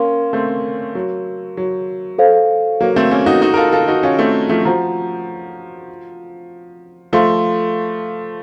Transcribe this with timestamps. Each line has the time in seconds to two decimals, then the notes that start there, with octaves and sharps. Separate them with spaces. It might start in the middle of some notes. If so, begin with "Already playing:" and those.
Already playing: A#3 C#4 A#4 F5 C6
0.33 A3 C4
0.95 F#3
1.57 F#3
2.18 A4 C5 F5
2.81 F#3 A#3
2.96 A3 C4
3.11 A#3 C#4
3.26 D#4 F#4
3.42 D#4 F#4
3.54 A#4
3.57 F4 A4
3.72 F4 A4
3.88 D#4 F#4
4.03 C#4 F4
4.19 A3 C4
4.49 F3 A3
4.65 F3 F#4 C5 F#5 A#5
7.13 F3 A3 A4 C5 F5 C6